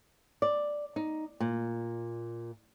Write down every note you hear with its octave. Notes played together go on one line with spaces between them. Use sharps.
D5
D#4
A#2